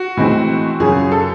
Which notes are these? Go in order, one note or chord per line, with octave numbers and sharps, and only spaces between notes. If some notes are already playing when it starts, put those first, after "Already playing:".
Already playing: F#4
A2 E3 G#3 C4
F#2 C#3 F#3 G#4
A4